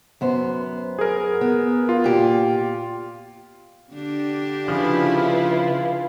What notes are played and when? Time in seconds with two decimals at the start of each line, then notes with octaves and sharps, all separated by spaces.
0.21 F#2 B3 C5
0.99 G#4 A#4
1.41 B3
1.89 F4
2.04 A#2 G4
3.93 D3 D4 G4
4.68 C#3 F3 E4 F4 B4